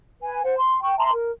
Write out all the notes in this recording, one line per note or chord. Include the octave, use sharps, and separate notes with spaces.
B4 G#5
C5 F#5
C6
G5 C#6
E5 A5 A#5 C6
A#4